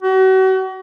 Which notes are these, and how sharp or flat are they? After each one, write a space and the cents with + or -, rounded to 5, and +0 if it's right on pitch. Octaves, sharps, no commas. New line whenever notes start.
F#4 +40